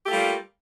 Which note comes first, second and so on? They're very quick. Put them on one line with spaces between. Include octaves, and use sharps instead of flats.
G4 A3 F4 G3 A#3